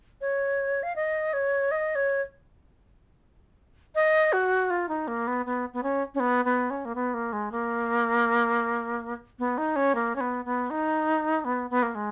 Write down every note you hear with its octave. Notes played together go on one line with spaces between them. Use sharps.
C#5
F5
D#5
C#5
D#5
C#5
D#5
F#4
F4
D#4
A#3
B3
B3
B3
C#4
C#4
B3
B3
C#4
A#3
B3
A#3
G#3
A#3
B3
D#4
C#4
A#3
C#4
B3
B3
D#4
B3
B3
A#3
G#3